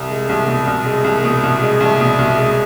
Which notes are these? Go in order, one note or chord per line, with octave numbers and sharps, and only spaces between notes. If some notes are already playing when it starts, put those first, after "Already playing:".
Already playing: C2
G#3
C2
B2
C2
G#3
C2
B2
C2
G#3
C2
B2
C2
G#3